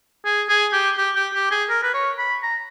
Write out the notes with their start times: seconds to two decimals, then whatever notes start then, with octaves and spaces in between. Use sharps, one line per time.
0.25 G#4
0.49 G#4
0.73 G4
0.97 G4
1.15 G4
1.34 G4
1.51 G#4
1.69 A#4
1.83 B4
1.94 C#5
2.18 B5
2.42 A#5